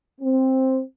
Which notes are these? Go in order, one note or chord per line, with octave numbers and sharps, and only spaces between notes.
C4